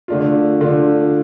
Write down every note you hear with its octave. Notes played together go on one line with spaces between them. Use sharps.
D3 A3 D4 F4
D3 A3 D4 F4